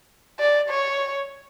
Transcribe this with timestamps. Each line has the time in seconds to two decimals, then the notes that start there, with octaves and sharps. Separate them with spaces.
0.40 D5
0.70 C#5